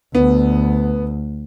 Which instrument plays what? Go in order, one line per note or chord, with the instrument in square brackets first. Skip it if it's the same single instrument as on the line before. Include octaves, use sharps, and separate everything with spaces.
[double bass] D2 [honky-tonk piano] B3